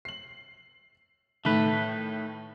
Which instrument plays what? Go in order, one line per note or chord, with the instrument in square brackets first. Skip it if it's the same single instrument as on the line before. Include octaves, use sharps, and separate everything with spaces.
[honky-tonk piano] C7 F#7
[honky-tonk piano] A2 D#3 [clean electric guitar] A3 B4